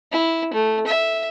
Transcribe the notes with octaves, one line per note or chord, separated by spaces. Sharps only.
E4
A3
E5